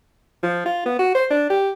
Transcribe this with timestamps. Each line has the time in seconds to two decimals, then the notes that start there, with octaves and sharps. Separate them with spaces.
0.43 F3
0.65 F4
0.86 B3
0.99 F#4
1.14 C5
1.31 D4
1.50 G4